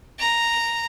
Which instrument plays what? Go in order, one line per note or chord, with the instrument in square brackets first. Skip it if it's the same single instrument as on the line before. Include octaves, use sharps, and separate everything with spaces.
[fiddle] A#5